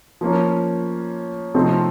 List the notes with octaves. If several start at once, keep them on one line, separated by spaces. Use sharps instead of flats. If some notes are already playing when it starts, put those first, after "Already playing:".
F3 A#3 C#4
C3 F3 A3 C4 D#4